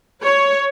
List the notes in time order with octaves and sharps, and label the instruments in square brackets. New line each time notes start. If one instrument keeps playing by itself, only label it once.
[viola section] C#5